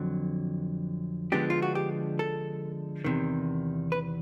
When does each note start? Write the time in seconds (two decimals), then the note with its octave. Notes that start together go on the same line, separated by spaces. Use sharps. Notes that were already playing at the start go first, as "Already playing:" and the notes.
Already playing: F2 D3 F#3
1.32 D3 F3 G#3 B3 D4 G4
1.50 F4
1.62 F#4
1.75 G4
2.19 A4
3.04 E2 C3 D#3
3.92 B4